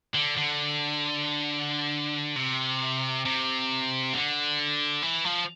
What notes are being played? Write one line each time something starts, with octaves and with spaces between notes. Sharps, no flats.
D3
D3
C3
C3
D3
E3
F3